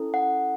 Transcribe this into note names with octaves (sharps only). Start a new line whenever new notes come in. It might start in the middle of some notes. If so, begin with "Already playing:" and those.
Already playing: C#4 E4 A4
F#5